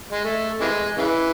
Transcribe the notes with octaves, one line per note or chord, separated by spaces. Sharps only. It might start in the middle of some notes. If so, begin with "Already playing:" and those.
G#3
A3
C3 E3 G#3
C#3 E3